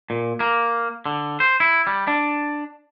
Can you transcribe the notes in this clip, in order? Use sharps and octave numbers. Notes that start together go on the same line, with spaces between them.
A#2
A#3
D3
C5
E4
G3
D4